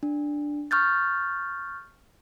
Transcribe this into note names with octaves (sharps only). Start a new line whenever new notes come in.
D4
C#6 F6 G6 A6